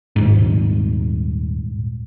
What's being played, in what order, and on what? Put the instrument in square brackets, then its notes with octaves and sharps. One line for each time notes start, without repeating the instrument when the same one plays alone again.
[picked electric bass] D#1 G#2